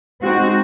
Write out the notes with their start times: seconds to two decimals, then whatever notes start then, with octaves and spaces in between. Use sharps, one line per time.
0.22 G#3 C4 D#4 F#4